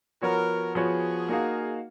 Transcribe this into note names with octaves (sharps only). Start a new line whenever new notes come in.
F3 B3 F#4 A#4 C#5
F3 B3 F#4 G#4 C#5
A#3 D#4 F#4 A#4 F5